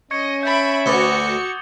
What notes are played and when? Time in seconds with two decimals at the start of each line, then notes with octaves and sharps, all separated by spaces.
0.11 C#4 D#5 C#6 G#6 C#7
0.43 E5 B5 G6 A6 D7
0.86 D2 F#4 B4 D6 D#6 C#7 G7